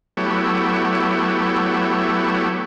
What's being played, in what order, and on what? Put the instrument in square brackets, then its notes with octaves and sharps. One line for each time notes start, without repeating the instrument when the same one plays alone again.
[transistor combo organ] F#3 A3 B3 E4 G4 C#5